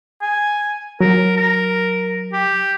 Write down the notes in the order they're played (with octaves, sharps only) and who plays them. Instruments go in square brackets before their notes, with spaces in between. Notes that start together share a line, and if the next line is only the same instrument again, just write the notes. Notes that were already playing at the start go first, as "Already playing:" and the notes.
[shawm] G#5
[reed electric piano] F#3 [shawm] A#4
[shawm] A#4
G4